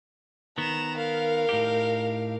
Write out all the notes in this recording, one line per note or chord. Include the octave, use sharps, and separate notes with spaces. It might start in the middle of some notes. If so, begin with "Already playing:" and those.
D#3 B3 A#5 E7
A#4 F5
A2 D#4 G4